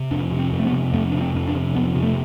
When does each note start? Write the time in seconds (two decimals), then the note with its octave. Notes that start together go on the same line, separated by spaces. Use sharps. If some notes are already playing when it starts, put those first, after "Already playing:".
Already playing: C3
0.11 F2 D4
0.32 C3
0.39 C4
0.53 F2
0.59 A3
0.66 B3
0.72 C3
0.93 F2 A3
1.12 C3 D4
1.21 C4
1.34 F2
1.48 D4
1.54 C3
1.74 F2 B3
1.95 C3
2.03 A3